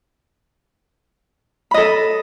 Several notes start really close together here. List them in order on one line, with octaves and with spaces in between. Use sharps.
B5 D#5 A4